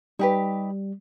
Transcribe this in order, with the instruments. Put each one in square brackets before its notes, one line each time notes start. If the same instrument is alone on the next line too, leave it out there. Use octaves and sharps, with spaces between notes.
[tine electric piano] G3 [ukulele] D#4 G4 B4